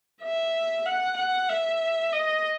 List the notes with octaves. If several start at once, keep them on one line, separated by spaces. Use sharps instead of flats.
E5
F#5
F#5
E5
D#5